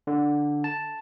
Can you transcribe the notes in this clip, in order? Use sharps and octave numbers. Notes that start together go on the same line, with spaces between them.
D3
A5